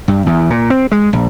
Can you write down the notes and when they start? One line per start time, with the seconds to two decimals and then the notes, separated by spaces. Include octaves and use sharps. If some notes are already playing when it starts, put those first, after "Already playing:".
0.08 G2
0.26 E2
0.50 A#2
0.70 C4
0.92 G#3
1.13 A#1